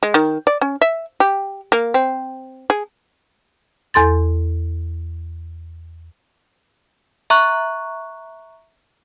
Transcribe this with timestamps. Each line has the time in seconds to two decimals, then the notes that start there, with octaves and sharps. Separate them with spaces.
0.03 G#3
0.14 D#3
0.47 D5
0.61 C#4
0.81 E5
1.20 G4
1.72 A#3
1.94 C4
2.70 G#4
3.94 E2 A4 C6 A6
7.30 E5 A#5 C#6 F#6